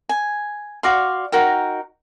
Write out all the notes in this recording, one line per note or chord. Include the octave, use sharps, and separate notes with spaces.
G#5
F#4 D5 F5 C6
D#4 F#4 A#4 G5